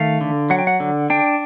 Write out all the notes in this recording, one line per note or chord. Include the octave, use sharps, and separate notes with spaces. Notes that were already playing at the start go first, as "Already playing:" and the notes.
Already playing: D#3 A3 F5
D3
F#3 F#5
G5
F#5
D3
D4 G5